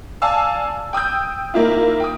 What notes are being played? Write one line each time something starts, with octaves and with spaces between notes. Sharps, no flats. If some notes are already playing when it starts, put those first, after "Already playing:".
D5 F5 G#5 A5 E6
G5 D#6 E6 G6
D#3 A#3 E4 F4
G5 D#6